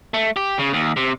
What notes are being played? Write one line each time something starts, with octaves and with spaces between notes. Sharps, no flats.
A3
G4
C#3
D#2
C3